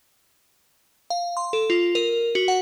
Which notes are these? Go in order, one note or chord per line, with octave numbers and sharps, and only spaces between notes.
F5
C6
A4
F4
A#4
F#4
F#5